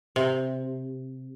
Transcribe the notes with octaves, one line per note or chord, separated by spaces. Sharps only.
C3